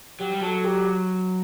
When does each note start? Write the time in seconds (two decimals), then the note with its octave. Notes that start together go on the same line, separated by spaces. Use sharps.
0.19 F#3 G4
0.30 G3
0.41 F#3 A4
0.64 G4